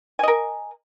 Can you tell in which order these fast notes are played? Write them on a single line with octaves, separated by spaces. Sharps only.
G#5 D#5 A#4